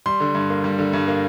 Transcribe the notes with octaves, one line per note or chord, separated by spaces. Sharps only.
G3 C6
D3
G2
A#3
G3
D3
G2
A#3